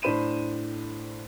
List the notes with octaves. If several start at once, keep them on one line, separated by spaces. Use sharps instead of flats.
A2 D4 C5 B5 D#7 E7